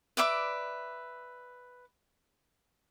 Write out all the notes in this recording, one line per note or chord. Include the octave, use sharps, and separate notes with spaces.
B4 D5 E5 D6